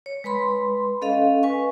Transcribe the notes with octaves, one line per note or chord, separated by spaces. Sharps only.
C#5
G#3 B4 B5 C6
C#4 A4 D#5 F5
B4 G#5 C#6